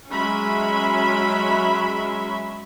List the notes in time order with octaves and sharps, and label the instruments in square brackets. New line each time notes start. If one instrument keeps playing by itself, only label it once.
[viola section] F#3 G#3 C#4 E5 B5